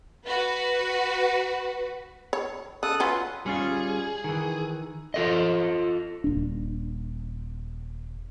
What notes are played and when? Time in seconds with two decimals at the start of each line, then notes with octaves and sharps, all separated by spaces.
0.25 F#4 B4
2.33 C#5
2.83 C#3 A4 D#6 F#6
3.00 F#3 C#4 F4 B4
3.46 G3 C#4 F4 G#4
4.24 D#3 E3
5.14 F4 A4 D#5
6.24 D#1 D4